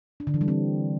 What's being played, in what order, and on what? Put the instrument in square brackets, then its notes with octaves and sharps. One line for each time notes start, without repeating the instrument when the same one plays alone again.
[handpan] D4
D3
E3
G3
C4